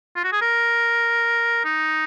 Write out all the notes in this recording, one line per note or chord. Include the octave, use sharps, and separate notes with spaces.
F4
F#4
G#4
A#4
D#4